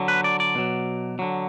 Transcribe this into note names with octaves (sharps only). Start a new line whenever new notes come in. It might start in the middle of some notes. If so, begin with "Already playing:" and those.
Already playing: D3 F#3
B4
D5
D5
B2 F#3
D3 F#3